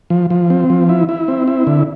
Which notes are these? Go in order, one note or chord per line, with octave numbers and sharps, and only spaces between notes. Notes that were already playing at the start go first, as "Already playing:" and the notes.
F3
F3
C4
F3
E4
E4
C4
E4
D3